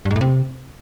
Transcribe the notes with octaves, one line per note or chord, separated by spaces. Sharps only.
G2
G#2
A2
C3